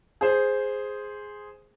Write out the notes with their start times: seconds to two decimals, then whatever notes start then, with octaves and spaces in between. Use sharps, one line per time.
0.21 G#4 C5